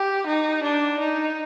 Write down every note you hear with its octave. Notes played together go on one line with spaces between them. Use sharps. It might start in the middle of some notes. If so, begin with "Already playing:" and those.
Already playing: G4
D#4
D4
D#4